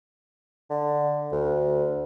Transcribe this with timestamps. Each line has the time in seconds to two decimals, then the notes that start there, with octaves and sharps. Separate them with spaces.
0.70 D3
1.32 D2